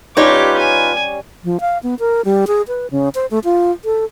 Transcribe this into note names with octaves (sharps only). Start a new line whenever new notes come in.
G3 C#4 D#4 F4 G4 B4 C#5 D6
G#5
F3
F5
B3
A#4
G3
G#4
B4
C#3
C5
A3
F4
A4